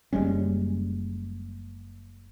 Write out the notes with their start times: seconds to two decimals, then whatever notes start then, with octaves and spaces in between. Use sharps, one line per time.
0.13 F#1 G3 G#3 C#4